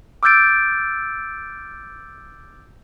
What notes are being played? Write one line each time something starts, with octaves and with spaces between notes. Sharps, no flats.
D6 E6 F6 G6 A6 D7